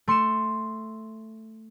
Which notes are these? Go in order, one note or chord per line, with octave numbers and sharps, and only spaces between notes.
A3 C6 C#7 E7